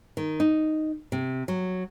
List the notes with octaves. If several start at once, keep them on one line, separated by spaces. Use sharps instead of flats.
D#3
D#4
C3
F#3